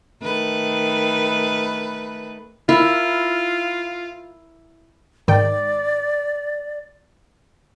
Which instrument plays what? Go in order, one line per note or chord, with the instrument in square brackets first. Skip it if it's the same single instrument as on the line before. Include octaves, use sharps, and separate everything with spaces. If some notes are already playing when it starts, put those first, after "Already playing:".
[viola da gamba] D#3 A3 B4
[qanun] E4 A#4 [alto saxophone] F4
[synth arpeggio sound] G#2 D#3 G5 [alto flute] D5